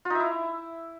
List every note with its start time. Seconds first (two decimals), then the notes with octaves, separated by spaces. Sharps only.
0.05 F4
0.10 D#4
0.15 E5
0.20 E4